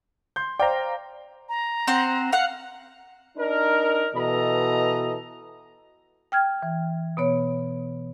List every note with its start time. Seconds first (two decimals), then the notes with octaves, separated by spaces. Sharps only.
0.36 C6 G6
0.59 C5 D5 F5 G5 A#5
1.49 A#5
1.87 C4 C5 F#5
2.33 F5 F#5
3.38 D4 D#4 A#4
4.15 B2 E3 A4 D#5 A#5
6.32 G5 F6 G#6
6.63 E3
7.17 B2 B3 C#5